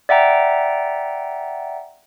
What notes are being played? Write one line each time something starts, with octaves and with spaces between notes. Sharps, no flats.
D5 E5 F#5 G5 A#5